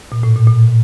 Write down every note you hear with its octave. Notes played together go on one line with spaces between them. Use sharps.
A#2
A2
A#2
A#2